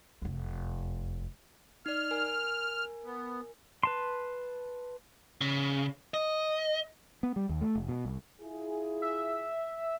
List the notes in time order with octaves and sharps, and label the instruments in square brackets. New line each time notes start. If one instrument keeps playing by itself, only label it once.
[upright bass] F1 E2
[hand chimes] D#4 D5 [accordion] F6
[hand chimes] A#4 G#5
[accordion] B3
[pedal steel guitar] B4 A5 C6
[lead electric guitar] C#3
D#5
[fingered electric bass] B3
G3
D#2
A3
F1
B2
C2
[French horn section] E4 F4 G#4
[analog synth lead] E5